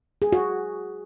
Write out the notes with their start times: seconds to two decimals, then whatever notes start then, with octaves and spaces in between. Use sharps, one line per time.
0.22 G#4
0.32 F#4